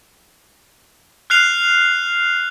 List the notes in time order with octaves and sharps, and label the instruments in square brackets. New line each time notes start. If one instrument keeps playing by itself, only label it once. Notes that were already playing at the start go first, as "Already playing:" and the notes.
[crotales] F6 F#6 C7 F7